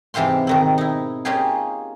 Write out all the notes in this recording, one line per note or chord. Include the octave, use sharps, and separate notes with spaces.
G#2 C3 E3 G4 F5 C6
B2 D#3 C4
D#4 E4
A#3 C#4 D#4 F4 G4 G#4